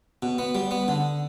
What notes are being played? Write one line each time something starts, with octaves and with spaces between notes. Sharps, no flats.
B2
B3
G3
B3
D3